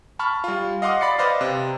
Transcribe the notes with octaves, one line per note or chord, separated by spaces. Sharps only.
A5 B5 C#6 F6
G3 F4
D#5 F5 F#5 C6 D6 D#6
D5 B5 A6 C7 C#7
B4 C5 D5 D#5 F5
C3